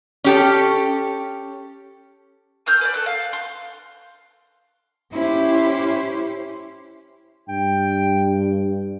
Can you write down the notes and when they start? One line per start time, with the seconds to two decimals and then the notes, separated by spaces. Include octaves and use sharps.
0.24 C#4 G4 A4
2.66 G#5 E6 F6 G6
2.81 B4 C#5 D5
2.94 A4 F#6
3.06 F5
3.33 C6
5.12 C#4 E4 G4 C5
7.49 G2 G5